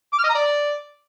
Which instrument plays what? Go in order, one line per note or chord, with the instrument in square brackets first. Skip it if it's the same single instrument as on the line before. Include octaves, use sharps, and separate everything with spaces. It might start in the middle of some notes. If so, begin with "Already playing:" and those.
[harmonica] D6
F6
D#5
A#5
D5